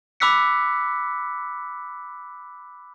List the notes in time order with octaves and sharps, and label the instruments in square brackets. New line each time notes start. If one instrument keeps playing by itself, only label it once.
[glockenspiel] B5 D6 E6 F#6 B6 C#7